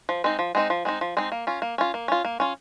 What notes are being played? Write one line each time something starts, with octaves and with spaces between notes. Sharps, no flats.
F3
G#3 C4 D#4
F3
G#3 C4 D#4
F3
G#3 C4 D#4
F3
G#3 C4 D#4
A#3
C#4 F4
A#3
C#4 F4
A#3
C#4 F4
A#3
C#4 F4